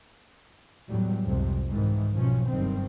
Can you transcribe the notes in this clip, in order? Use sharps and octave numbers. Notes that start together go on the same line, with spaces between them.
E2 A2 F#3 G3
C2 F2 G#2 C3
G#2 D#3 E3
B1 B2 F3 C#4
F#1 G2 D#3 C4